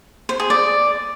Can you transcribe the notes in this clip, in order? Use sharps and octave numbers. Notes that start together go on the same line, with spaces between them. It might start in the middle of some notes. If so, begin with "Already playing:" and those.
C5
G#4
D5